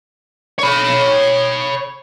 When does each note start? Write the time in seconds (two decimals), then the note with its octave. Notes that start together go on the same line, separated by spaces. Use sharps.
0.59 C#5 B5